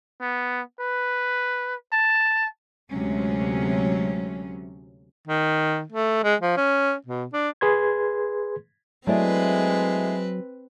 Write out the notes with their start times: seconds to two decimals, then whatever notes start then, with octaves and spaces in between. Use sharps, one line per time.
0.21 B3
0.80 B4
1.93 A5
2.90 D2 C3 F#3 G#3 A3 C#4
5.28 D#3
5.92 A3
6.24 G#3
6.41 F3
6.57 C#4
7.06 B2
7.33 D4
7.61 G#4 B4 C6 G#6
9.07 F#3 G#3 A3 C4 E4 B4 D5